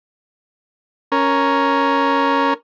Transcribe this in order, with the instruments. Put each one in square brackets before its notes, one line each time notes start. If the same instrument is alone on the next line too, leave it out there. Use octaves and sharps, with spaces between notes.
[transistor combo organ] C#4 A#4